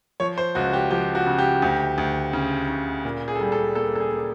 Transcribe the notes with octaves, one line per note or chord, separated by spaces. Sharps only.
F3 C#5
C5
C#2 F#4
G4
F3 G4
F#4
C#3
G4
D2
D2
C#3
C#3
A#2
G#4
A4
G3 G#4
A4
A#3 A4
A4
G#4
A#3